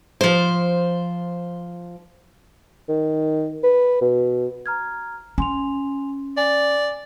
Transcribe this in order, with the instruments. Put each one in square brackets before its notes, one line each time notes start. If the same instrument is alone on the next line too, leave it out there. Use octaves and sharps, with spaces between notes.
[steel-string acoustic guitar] F3 C5
[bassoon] D#3
B4
B2
[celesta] A#5 F6 G#6
[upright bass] C#4 [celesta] G#5 C6 F7
[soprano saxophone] D5 [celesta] G#5